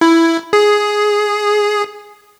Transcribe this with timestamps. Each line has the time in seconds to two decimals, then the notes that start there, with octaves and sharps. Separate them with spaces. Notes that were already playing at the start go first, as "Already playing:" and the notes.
0.01 E4
0.53 G#4